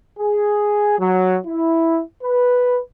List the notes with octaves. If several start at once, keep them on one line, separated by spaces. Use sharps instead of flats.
G#4
F#3
E4
B4